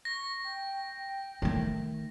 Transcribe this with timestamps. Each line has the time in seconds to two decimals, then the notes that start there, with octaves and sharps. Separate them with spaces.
0.05 C#6 A#6
0.45 G5
1.42 D#3 A3